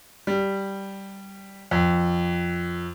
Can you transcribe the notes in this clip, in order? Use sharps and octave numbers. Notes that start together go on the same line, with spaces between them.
G3
F2